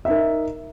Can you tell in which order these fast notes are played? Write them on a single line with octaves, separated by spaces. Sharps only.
E5 D#4 A#4